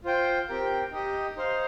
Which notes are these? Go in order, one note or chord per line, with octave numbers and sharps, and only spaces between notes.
F4 C5 G5
C4 G4 A#4 G5
D#4 G4 D#5
D#4 C5 F5